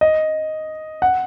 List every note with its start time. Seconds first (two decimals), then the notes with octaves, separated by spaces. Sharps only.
0.01 D#5
1.02 F#5